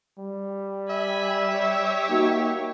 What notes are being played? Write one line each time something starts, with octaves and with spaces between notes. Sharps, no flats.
G3
E5 G#5 B5
G4 C#5
A#3 D#4 F#4